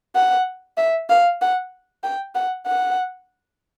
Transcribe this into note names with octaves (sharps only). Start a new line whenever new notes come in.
F#5
E5
F5
F#5
G5
F#5
F#5